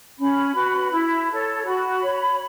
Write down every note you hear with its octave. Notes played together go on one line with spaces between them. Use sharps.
C#4 B5
F#4 B4
E4
A4 C#5
F#4 B5
C#5